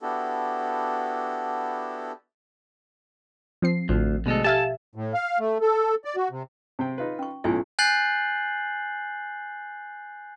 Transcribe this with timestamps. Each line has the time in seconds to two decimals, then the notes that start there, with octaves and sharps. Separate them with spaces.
0.01 B3 D4 E4 F#4 G4 A4
3.62 F3 C4 C7
3.89 A1 D2 F3
4.26 D2 B2 G#3 A4
4.44 G4 A4 E5 F5 G#5 A5
4.95 A2
5.14 F5
5.39 A3
5.61 A4
6.05 D5
6.16 F#4
6.31 C3
6.79 C3 C4 G5
6.98 D#4 F4 B4
7.19 C#4 C#6
7.44 B1 A2 C#4 E4 F4 G#5
7.79 G#5 F#6 G6 A6 C7 F#7